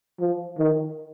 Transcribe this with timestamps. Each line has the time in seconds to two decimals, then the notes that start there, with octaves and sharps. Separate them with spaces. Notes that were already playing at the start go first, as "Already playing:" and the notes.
0.20 F3
0.59 D#3